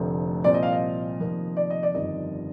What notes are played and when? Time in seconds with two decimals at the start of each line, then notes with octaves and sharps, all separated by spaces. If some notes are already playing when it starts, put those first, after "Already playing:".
Already playing: F1 F2 D3 A3 C4
0.44 C2 A#2 F3 C4 D5
0.54 D#5
0.63 F5
0.73 D#5
1.20 F1 F2 D#3 A#3
1.57 D5
1.70 D#5
1.83 D5
1.95 G1 F2 D#3 D#5